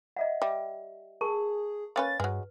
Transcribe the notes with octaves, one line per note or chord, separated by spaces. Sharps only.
D#5 E5 F#5
G3 E5
G#4 A#4 A5 C#6
A#3 C#4 B4 A6
G2 F#3 G#3 B4